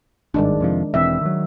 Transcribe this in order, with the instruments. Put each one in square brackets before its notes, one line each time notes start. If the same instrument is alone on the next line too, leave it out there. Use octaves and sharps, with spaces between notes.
[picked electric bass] G#1 G2 [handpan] D#3 G#3 D4
[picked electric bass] F2 C3 F3
[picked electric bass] E1 E3 C4 [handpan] E5
[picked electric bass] D#3 F#3